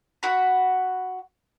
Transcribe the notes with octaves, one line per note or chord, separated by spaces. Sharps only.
F#4 F#5 B5